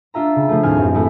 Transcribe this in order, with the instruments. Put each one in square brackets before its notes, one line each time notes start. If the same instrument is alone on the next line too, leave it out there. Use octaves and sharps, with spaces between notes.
[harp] D4 F4 E5 A#5
C#3
F3 A3
D#2 A2 C4 D4 G#5 F6
A1 F#2
A2 G#3 A3 E4